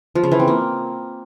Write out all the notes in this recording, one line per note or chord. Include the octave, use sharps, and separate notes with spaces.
F3
C#3
E3
C4
A#3